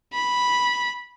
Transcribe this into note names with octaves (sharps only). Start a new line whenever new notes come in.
B5